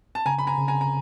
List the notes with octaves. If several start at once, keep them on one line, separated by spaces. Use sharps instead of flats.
A5
C#3 G#5 A#5
B5
G#5 A#5
C#3
G#5 A#5
A#5